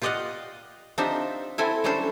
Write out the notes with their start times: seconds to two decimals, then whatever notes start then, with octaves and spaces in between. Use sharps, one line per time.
0.02 F4 G4 D5 D#5 F5 F#5
0.98 C4 D4 D#4 F4 G4 E5
1.58 C4 E4 A4 E5 G#5
1.84 F#3 G3 C#4 D4 A4 C5